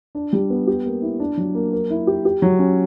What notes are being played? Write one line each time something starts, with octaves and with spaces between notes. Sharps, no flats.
D4
G3
B3
G4
A#3
E4
D4
F#3
A#3
A#4
E4
G4
G4
F#3
C#4